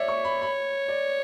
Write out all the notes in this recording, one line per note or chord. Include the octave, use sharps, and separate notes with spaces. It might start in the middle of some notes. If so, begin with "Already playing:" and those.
Already playing: C#5 D5 E5
C#6
B5
B5
D5